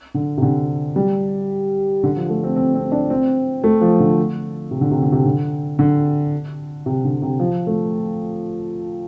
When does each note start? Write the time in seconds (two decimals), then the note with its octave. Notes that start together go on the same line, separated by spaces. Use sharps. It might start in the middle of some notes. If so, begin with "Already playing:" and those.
0.14 D3
0.37 C3
0.42 D3
0.96 G3
2.03 D3
2.16 F3
2.29 A3
2.43 C4
2.56 C4
2.75 C4
2.92 D4
3.10 C4
3.64 A3
3.81 F3
4.00 D3
4.71 C3
4.81 D3
4.91 C3
5.02 D3
5.12 C3
5.26 D3
5.79 D3
6.86 C3
7.04 D3
7.22 C3
7.39 F3
7.67 A3